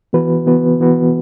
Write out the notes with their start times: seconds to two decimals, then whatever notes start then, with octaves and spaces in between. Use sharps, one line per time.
0.13 E3 B3 F#4 B4
0.46 E3 B3 F#4 B4
0.80 E3 B3 F#4 B4